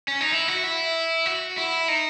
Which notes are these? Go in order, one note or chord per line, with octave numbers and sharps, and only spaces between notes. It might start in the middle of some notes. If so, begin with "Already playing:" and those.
C#4
D#4
E4
F#4
E4
F#4
E4
D#4